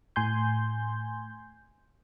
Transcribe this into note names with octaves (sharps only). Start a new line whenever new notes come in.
A2 G#5 C6 G6